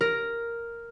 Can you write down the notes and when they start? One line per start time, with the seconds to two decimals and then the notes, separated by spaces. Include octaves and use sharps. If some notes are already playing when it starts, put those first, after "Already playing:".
0.01 A#4